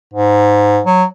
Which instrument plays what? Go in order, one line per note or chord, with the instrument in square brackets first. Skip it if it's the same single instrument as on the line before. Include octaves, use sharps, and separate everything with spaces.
[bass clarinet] G#2
F#3